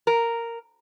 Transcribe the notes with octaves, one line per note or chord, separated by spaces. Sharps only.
A#4